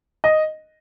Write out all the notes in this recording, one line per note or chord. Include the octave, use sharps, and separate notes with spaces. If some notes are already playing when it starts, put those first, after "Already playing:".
D#5